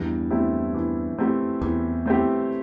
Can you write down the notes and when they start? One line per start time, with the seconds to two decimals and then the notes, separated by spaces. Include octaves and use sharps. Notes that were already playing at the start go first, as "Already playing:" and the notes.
Already playing: E2 G2 E3
0.31 A3 C4 E4 G4
0.74 E3
1.18 A3 C4 E4 G4
1.61 E2 E3
2.06 A3 C4 E4 G4